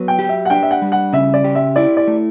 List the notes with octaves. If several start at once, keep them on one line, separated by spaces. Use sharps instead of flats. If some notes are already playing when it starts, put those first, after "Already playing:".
Already playing: F#3 B3
G5
G4
E5
F#5
D4 G5
E5
F#5
G3
F#5
C#3 E5
D5
G4
E5
E4 D5
D5
A3